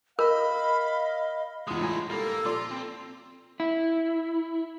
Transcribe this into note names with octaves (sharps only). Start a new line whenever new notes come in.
A#4 D#5 F5 B5
E2 G#3 E4 F4 D#6
A2 G#5 B5
G3 A#3 A4
A#2 F3 F4 D5 C6
C4
E4